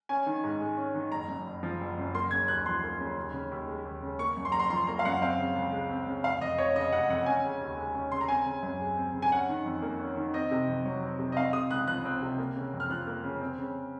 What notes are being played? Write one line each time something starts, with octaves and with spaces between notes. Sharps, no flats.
C#4 G#5
D#3
G#2
G#3
C#4
D#3
F#1 A#5
F#2
F#1
F3
F#1
F#2
A#3 C6
C#3 G#6
D#2 F#6
F3 C6
A#3
C#3
D#2
C#3
D#2
G#3
D#2
C#3
A#3 C#6
F#2
C6
F#1 A#5
C6
F3 C6
A#3 A#5
F5
F#2 F#5
C4 F5
C#3
C#2
G#3
C4
C#3
F1 F5
F2 D#5
F1 C#5
C#3 D#5
F1 F#5
F2 F#5
C#4 G#5
C#3
D#2
G#3
C#4
C#3 C6
A#5
C4 G#5
C#3
F#2
G#3
C4
C#3
G#5
C#4 F#5
D#3
F2
A#3
C#4
D#3
C4 D#5
C3
F2
F#3
C4
C3
D#5
C4 F5
C3 D#6
C#2 F#6
F3 F#6
C4
C3
A#3
C#3
F2
F6
F3 F#6
A#3
C#3
C4
C#3